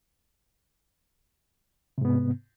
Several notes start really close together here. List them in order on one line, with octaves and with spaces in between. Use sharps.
C3 G#2 B3